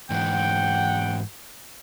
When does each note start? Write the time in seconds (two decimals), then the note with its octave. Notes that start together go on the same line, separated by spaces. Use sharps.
0.10 G#2 E3 F#5 G5